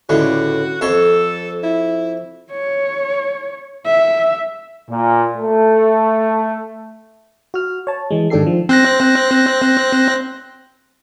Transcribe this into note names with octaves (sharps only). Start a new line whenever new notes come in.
C#2 A2 D3 F#4
F2 A4 C#5 C6
E4
C#5
E5
A#2
A3
F#4 F6
C#5 A5
E3 G#3
G#2 D#3 D4 G4 A4 C7
F3
C4 F#6 A#6